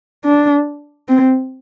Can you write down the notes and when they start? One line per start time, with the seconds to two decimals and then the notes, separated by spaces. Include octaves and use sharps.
0.24 D4
1.08 C4